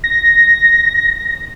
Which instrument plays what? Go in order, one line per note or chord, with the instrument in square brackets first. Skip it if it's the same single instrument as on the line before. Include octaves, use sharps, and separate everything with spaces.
[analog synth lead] A#6